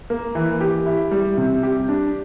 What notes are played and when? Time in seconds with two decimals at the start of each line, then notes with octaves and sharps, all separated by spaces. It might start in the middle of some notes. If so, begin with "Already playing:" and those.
0.10 A#3
0.35 E3
0.61 G4
0.86 E4
1.11 G3
1.37 C3
1.63 G4
1.89 D4